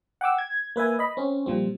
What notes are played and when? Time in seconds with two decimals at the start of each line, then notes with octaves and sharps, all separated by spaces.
0.21 F#5 G5 D6 E6
0.38 G#6
0.76 A#3 B4 E5 G#5
0.99 D#5 B5
1.17 C4 C#4
1.46 A#2 F3 G3 C4